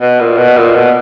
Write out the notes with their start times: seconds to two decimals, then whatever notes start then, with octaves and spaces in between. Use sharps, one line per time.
0.01 B2
0.20 A#2
0.38 B2
0.57 A#2
0.75 B2